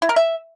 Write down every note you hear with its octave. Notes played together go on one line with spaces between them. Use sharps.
E4
A#4
E5